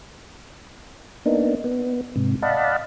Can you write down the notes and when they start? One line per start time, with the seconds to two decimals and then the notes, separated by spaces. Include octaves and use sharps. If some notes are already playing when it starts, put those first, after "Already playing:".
1.26 A#3 B3 D4 D#4
1.64 B3
2.16 G#2 C3
2.42 D5 D#5 F5 F#5 A5 B5